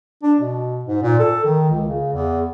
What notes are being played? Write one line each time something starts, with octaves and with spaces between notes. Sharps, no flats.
D4
B2
G#2
A#2
A4
D#3
C#2
C#3
E2